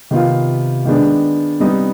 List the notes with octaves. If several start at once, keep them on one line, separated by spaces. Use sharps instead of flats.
C3 D#3 B3 F4
D#3 G#3 B3 D4
C3 G3 B3 D#4